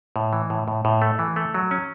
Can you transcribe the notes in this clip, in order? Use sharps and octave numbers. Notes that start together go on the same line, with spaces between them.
A2
E3
A2
A2
A2
A3
E3
A3
F#3
C#4